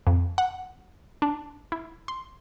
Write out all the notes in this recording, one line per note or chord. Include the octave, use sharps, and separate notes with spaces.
F2
F#5
D4
E4
C6